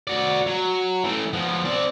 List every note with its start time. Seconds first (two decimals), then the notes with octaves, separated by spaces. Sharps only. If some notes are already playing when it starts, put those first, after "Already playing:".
0.07 F#4 D5
0.47 F#3
1.04 E3 A3
1.33 F3 B3
1.65 C4 D5